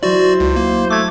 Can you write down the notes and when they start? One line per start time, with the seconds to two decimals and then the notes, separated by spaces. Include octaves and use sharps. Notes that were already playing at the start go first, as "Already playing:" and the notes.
0.03 F#3 E4 F#4 C5 D5
0.40 C#2
0.56 A#3
0.91 A3 D6 G#6